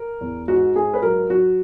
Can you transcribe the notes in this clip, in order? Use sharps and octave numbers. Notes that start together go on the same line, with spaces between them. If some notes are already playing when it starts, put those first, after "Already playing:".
Already playing: A#4
E2
G#2 F#4
G#2 G#4
B4
F#3 A#4
F#3 F#4